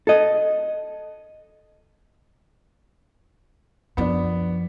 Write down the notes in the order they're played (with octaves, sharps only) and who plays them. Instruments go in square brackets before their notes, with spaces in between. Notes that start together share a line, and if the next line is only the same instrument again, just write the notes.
[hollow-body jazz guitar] A4 D#5
[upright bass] F#2 F3 [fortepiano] B3 D4